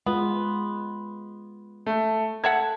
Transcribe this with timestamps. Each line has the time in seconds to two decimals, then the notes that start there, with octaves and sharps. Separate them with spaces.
0.06 G#3 B3 F4
1.86 A3
2.44 A4 E5 F#5 G#6